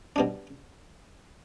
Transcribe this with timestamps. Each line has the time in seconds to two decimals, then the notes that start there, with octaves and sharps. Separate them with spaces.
0.16 B2 G3 D4